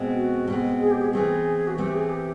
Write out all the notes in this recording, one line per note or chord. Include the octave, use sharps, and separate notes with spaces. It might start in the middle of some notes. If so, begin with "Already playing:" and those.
Already playing: B2 G#3 C4
F#4
B2 G#3 C4
G#4
G4
G#4
E3 A3 C4 G#4
F#4
E3 A3 C4 G4
G#4
G4